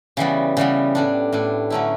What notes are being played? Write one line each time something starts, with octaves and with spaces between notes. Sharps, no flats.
C#3 E3 G3 B3
C#3 E3 G3 B3
A2 G3 D4
A2 G3 D4
D3 F#3 A3 C#4 E4